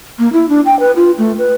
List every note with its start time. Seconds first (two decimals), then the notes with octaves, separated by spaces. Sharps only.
0.19 A#3
0.33 E4
0.49 D4
0.66 G5
0.80 B4
0.96 F4
1.18 A3
1.38 B4